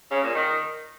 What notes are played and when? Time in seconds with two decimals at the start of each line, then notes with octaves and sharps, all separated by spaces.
0.12 C#3
0.23 A#2
0.35 D#3